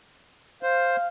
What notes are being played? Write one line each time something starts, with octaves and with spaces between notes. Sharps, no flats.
C5 F5